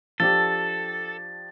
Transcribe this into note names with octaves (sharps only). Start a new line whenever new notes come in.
F3 D4 G4 A4 A6